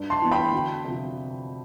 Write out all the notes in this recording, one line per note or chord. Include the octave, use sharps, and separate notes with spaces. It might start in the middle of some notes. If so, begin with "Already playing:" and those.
Already playing: G2
A5 C6
E3 B3
G5 B5
D2
C3 F3